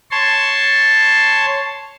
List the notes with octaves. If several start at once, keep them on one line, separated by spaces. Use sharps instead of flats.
C#5 A5 C6